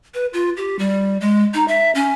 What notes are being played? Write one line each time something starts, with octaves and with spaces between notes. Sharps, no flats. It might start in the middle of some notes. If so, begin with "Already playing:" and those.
B4
F4
G4
G3
G#3
D#4
E5
C#4